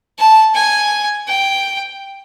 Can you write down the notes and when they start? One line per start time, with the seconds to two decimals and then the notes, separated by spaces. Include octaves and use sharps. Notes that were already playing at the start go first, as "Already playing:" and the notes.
0.19 A5
0.55 G#5
1.28 G5